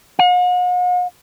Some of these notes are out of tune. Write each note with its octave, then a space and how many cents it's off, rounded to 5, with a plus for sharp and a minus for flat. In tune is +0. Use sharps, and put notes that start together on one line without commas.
F#5 -45